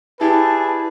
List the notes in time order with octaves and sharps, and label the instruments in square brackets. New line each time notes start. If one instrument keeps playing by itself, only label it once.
[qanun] E4 G4 D5 [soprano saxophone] G#4 [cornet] B4 [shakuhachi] A5